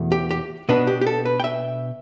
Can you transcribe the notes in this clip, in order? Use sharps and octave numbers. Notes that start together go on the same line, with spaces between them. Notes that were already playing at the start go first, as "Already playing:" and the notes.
Already playing: E2 B2 A3
G4
G4
B2 B3 D4 B4
G4
G4
A4
B4
G5
E5